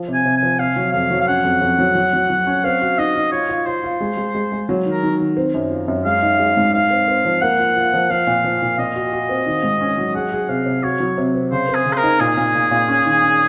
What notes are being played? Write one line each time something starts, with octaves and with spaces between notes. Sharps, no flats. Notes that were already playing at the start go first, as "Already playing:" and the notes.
Already playing: F3
C3
G#5
C3
G#5
F3
C3 F5
F#3
F2 F5
F#3
F5
C#4 F#5
F2
F2
F#3
F#3
F#3
F#3
C#4
C4 F5
F#4
D#4 D#5
D#4
F4 C#5
F4
F4 C5
F4
G#3
G#3
G#3
G#3
F#3
D#3
A#4
D#3
D#3
C4
F#2
F4
F#2
G#3 F5
D#4
G#3
G#2
D#4 F5
C4
C4
F3
A#3 F#5
F4
F4
F3
F3 F5
A#2
F3
A#2
A#2 D#5
F#4
F#4
C4
D#3
G#2
C#4
F#3
G#4 F#5
G#4
C3 F5
C3
F#4 C#5
F#3
C3
C4
C#3 C5
C4
G#4
C#3
C5
A#4
D#4
A#2 G#4
A#2
A#2
A#2
C#4
D#3
C#4